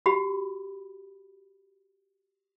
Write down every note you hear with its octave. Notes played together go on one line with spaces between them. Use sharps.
F#4 G4 B5